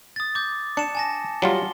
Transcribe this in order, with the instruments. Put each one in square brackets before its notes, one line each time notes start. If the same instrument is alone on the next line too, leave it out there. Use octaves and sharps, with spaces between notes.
[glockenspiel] D#6 A6
D6 G6
[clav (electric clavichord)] D4 [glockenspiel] C#7 E7
[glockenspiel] G#5 A5 A#6
[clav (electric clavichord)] F#3 G3 F4 [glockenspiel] G7